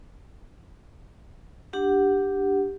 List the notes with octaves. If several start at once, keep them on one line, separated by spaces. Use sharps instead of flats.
D4 G4 F#5